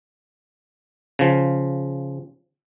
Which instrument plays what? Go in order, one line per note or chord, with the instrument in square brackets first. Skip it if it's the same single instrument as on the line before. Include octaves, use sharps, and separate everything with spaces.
[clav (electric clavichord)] C#3 F3